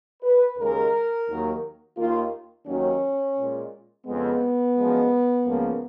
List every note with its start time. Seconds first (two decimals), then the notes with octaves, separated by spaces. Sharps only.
0.23 B4
0.58 D#2 C#3 G#3 A#4
1.28 D#2 D#3 F#3 A#3
1.97 D#2 D#3 A#3 F4
2.67 D#2 D#3 F#3 A#3 C#4
3.37 A#2 G#3
4.06 F2 C#3 G#3 B3
4.76 F#2 F3 G#3
5.46 C#2 C#3 F3 A#3